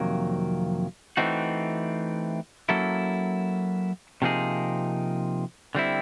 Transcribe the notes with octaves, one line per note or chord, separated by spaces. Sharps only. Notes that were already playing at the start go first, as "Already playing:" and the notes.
Already playing: F2 C3 D#3 F#3 A#3
E3 A3 C4 D#4 F#4
F#3 A#3 C#4 E4 A4
C3 F3 A#3 D#4 G#4
D3 G3 C4 E4